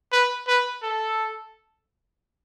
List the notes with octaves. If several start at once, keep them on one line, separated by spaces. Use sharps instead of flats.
B4
B4
A4